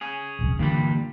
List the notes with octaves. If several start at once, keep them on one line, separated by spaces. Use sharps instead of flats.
C#4 G#4
D#1 C2 F2
G2 A#2 D3 E3 G3 A#3